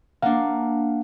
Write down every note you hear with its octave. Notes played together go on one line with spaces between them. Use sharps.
A#3 D4 F5 F#5